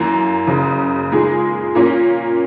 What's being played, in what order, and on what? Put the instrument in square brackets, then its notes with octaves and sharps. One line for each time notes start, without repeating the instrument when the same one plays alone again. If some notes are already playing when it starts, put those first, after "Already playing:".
Already playing: [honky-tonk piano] F#2 E3 A#3
F#1 F#2 C#3
A#2 G#3 D#4 G#4
A#2 A#3 C#4